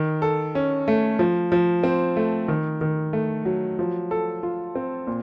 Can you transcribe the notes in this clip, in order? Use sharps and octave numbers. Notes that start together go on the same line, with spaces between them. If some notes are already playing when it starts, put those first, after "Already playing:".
Already playing: D#3
A4
C#4
A3
F3
F3
C4
A3
D#3
D#3
A3
F#3
F3
A4
F4
C4
A#2